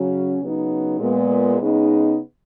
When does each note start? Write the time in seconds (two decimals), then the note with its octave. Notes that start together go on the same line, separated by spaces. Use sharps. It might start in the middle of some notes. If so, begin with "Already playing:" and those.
Already playing: C#3 F#3 C#4
0.40 C#3 F#3 B3 D#4
0.99 A#2 G#3 B3
1.59 C#3 G#3 B3 D#4